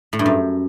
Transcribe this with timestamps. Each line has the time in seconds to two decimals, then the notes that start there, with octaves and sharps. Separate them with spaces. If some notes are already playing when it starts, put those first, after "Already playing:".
0.13 A2
0.19 G2
0.26 F#2